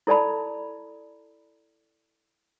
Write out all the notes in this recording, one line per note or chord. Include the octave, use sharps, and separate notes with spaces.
E4 A4 D5 A5 B5